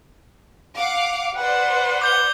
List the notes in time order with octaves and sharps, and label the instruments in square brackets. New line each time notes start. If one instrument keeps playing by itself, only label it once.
[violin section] F5 F#5 D6
[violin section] B4 C5 D5 [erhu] F#5
[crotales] D6 G6 G7